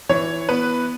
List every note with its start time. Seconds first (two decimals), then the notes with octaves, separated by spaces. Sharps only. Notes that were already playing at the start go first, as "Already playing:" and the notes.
0.09 E3 C#5
0.49 B3 B4